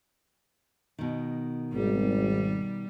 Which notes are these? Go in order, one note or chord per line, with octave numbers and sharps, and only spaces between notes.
B2 D#3
G#1 G3